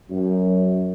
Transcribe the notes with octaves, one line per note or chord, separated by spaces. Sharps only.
F#2